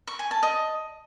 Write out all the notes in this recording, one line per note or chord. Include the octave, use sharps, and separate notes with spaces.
C#6
G#5
A5
D#5